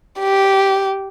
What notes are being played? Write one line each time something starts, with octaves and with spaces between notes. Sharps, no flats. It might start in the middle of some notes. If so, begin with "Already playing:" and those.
G4